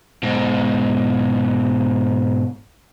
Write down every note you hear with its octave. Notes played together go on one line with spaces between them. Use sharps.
G#2 B2